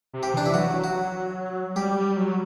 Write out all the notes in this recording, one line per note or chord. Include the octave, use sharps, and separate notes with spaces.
C3
G4
E3 D4
E4
F#3 F#4
F#4
G3 G4
G3
F#3